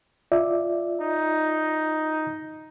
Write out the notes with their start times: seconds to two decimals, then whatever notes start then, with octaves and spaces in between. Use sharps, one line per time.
0.32 F4 D5 E5
1.01 D#4